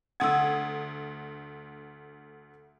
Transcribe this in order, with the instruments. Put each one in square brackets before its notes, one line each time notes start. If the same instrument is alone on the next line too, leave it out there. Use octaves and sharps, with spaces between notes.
[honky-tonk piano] D2 D#6 G#6 [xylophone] F#5 E6